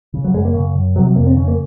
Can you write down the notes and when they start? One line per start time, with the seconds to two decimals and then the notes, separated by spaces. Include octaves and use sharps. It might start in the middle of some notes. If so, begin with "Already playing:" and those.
0.14 C#3
0.24 F#3
0.34 F#2 G#3
0.45 A#3
0.54 C#3
0.75 F#2
0.96 C3 F#3
1.07 F#3
1.16 F2 A#3
1.27 C4
1.37 C#3 C#4
1.48 A#3